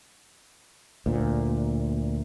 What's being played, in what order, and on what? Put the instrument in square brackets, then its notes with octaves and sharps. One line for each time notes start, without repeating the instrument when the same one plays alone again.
[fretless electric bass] D2 A#2